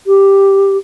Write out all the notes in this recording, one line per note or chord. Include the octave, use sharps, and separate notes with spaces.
G4